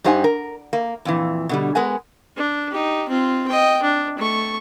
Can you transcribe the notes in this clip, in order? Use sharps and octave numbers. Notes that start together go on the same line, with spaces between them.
G2 D#4 G4 C5 F#5 G#5
A#4
A#3
F2 A#2 E3
B2 D3 G3
G#3 B3 A#4 F#5 G#5
D4
D#4 G4
C4 F4
D#5 G5
D4
A3 C#6